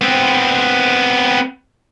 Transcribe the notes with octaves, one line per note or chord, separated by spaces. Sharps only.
B3 C4